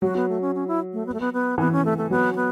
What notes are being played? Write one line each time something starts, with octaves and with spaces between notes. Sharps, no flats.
F#3 F#4
B3
A3
C#4
C#4
E4
A3
B3
A3
B3
B3
E3 B3
C#4
A3
A3
F#3 B3
C#4
B3